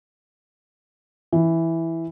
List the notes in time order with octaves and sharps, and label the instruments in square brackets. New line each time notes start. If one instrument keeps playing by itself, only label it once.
[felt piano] E3